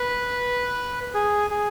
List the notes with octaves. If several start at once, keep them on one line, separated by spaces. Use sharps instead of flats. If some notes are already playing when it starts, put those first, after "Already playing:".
Already playing: B4
G#4
G#4